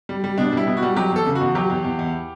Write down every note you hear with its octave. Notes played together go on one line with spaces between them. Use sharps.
G3
G3
B2 D4
G3 E4
B2
F#4
G3
F#3 G4
E2 A4
C#3
F#4
E2
F#3 G4
E2
E2
E2